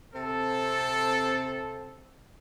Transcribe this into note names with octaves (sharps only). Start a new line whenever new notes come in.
C3 C4 A4